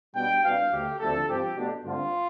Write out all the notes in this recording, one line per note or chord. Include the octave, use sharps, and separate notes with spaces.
B2 G3 B3 D4 G5
C2 B2 B3 D4 F5
D2 D3 A3 G4
D2 C3 F3 A3 D4 A4
G2 F3 C4 G4
B2 A3 D4
G2 D3 A3 C4 F4